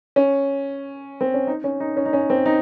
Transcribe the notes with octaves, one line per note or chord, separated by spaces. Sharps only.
C#4
C4
C#4
D#4
C#4
D#4
C#4
D#4
C#4
C4
D#4